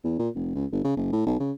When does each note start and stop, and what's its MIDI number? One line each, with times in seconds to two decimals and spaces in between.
0.04 0.15 40
0.19 0.29 46
0.35 0.53 29
0.55 0.66 37
0.72 0.83 31
0.84 0.93 49
0.96 1.07 30
1.12 1.25 45
1.26 1.35 35
1.40 1.52 49